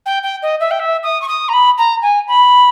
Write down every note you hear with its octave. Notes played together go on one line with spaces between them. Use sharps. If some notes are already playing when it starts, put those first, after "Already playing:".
G5
G5
D#5
E5
G5
E5
D#6
C#6
D#6
A#5
B5
A#5
G#5
B5